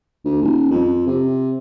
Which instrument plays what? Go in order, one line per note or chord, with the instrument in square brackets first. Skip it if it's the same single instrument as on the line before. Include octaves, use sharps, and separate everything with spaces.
[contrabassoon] D2
D#1
F2
C3